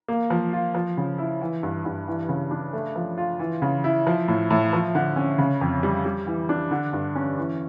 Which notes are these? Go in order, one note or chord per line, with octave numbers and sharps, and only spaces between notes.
A#3
F3
F4
F3
C#3
E4
E3
G2
G2
E3
C#3
D4
A3
F3
F4
E3
C#3
E4
F3
A2
A2
F3
D3
C#4
C#3
F2
G3
G3
E3
D4
D3
G2
C#4
E3